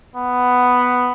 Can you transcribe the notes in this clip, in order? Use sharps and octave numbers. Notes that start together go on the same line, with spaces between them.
B3